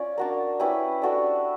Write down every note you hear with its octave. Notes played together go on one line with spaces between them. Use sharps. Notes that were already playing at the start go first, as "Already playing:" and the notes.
Already playing: C#4 F4 D5
D4 F#4 A#4
C#4 E4 G4 B4
D4 F#4 A4 D5